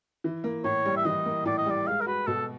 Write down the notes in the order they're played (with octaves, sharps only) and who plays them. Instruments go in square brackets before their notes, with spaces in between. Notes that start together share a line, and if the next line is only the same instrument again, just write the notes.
[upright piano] E3
A#3
[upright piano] A2 [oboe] C#5
[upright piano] G3
[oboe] E5
[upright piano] E3 [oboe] D#5
[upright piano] A#3
[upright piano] A2 [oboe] D5
[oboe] D#5
[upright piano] G3 [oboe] D5
[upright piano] G#3 [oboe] F5
[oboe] A#4
[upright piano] F#4 [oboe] B4
[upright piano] B2 [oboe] A4